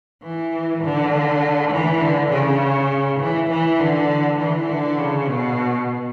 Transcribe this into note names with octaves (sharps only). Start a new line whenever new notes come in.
E3
D3
E3
D3
C#3
E3
E3
D3
E3
D3
C#3
B2